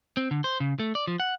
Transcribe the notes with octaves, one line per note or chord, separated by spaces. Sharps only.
C4
D3
C5
C#3
A3
D5
F3
F#5